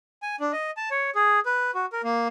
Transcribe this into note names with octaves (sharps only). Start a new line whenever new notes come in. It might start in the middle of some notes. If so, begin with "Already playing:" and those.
G#5
D4
D#5
A5
C#5
G#4
B4
F#4
A#4
A#3